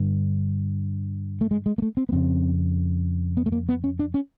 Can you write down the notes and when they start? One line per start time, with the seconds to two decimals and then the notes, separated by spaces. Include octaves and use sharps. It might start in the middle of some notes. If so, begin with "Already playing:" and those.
Already playing: G2 D3
1.41 A3
1.51 G#3
1.66 G#3
1.78 A#3
1.82 A3
1.97 C4
2.09 B3
2.12 F2 C#3 C4
3.37 B3
3.46 A3
3.52 A#3
3.69 B3
3.84 C#4
3.99 D4
4.14 C#4